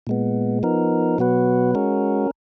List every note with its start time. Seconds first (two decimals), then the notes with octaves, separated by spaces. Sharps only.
0.07 A#2 G#3 B3
0.63 F3 B3 D#4 A#4
1.18 B2 F#3 B3 F#4 B4
1.75 G#3 C#4 F#4 A#4